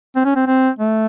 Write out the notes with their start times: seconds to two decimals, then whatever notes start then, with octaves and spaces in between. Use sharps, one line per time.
0.16 C4
0.25 C#4
0.35 C4
0.47 C4
0.79 A3